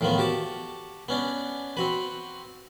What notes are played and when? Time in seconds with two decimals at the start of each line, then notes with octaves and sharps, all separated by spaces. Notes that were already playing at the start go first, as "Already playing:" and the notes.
0.01 A2 D#3 F3 B3
0.18 F#4 G4 A5
1.09 B3 C#4 D4
1.77 C4 F#4 B4